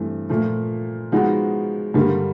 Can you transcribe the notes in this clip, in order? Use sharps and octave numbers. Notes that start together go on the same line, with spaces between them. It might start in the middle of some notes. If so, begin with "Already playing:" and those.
Already playing: G2 E3 A3 C4
A#2 F3 A3
F3 G#3 B3 D#4 F#4
G2 D3 G3 A#3